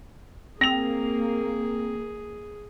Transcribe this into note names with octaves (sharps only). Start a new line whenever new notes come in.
A#3 C4 G#4 A#6 F7